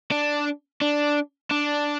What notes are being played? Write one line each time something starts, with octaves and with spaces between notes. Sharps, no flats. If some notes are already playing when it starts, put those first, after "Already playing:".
D4
D4
D4